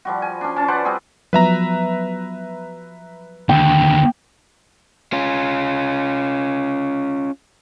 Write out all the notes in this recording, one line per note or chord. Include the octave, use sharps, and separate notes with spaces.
F3 G3 F#4
G#5
C#4 D4
C#4 A5
B4 C5 D5 F#5
G3 C4 F#4 G#4
F3 F#3 B3 B4 E5 A#5
D#2 D3 G5 E6
C#4 F4